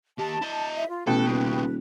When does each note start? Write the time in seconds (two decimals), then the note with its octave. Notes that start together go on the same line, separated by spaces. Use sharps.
0.18 D#2 G4 A5
0.42 E4 D#5
0.75 E5
0.88 F4
1.07 A1 B2 A4 B4 G5
1.27 D#1 D#2 C#3